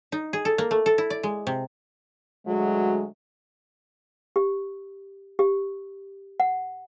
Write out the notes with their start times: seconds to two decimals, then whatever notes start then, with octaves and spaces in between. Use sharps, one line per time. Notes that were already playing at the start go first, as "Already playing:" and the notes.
0.12 D#4
0.33 G#4
0.45 A4
0.58 A#3
0.71 A3
0.86 A4
0.98 E4
1.10 D5
1.23 G#3
1.47 C3
2.46 D2 F#3 G#3
4.36 G4
5.39 G4
6.40 F#5